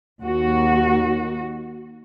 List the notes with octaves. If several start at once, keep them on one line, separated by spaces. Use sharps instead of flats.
D#2 F#4